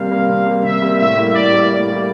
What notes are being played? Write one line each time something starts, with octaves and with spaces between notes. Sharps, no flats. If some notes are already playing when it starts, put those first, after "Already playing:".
Already playing: C3 G3 A#3 F5
G3 A#3
C3
G3 A#3
C3 E5
G3 A#3
A2 E5
G3 A#3 E4
A2 D5
G3 A#3 E4
A2 D5
G3 A#3 E4